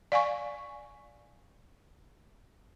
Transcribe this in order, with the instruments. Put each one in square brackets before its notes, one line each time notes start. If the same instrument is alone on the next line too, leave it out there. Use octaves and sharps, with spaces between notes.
[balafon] D5 F5 G#5 C#6